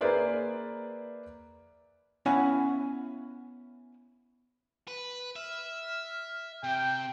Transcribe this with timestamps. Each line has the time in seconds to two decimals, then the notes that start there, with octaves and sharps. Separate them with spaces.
0.01 A#3 G#4 B4 C5 D5 E5
2.26 B3 C#4 E4 F5 F#5 G#5
4.88 B4
5.36 E5 F6
6.64 C3 G5